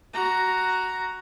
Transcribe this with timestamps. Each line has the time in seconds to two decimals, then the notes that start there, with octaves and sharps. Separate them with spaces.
0.13 F#4 A#5